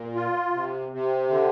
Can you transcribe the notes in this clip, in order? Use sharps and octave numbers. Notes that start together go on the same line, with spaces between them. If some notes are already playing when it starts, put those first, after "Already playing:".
Already playing: A#2
F4
C3
C3
D3